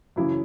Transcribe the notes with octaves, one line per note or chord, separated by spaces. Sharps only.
F#2 C#3 E3 E4